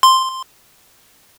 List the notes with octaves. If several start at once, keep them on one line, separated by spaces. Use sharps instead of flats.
C6